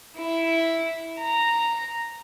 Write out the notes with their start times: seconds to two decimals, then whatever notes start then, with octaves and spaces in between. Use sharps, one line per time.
0.18 E4
1.21 A#5